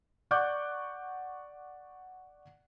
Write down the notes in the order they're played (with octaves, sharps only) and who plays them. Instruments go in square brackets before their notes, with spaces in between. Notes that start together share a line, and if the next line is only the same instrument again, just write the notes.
[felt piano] D5 F#5 C#6 D6 F#6 G6